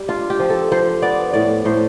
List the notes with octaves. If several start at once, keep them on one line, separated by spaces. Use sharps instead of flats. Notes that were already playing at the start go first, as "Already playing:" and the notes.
Already playing: G3 G4
D4 F4
G4
F3
A4
F3 C5
B3 D5
A2 D5
A2 C5